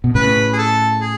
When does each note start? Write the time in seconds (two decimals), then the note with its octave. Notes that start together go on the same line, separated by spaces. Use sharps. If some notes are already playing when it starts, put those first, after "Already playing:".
0.04 B2
0.15 A2 C#3 B4
0.53 G#4
0.58 A4
1.01 G#4